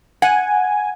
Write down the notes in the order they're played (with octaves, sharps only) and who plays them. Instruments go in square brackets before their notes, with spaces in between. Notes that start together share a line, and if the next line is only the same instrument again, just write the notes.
[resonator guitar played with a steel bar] F#5 [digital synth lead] G#5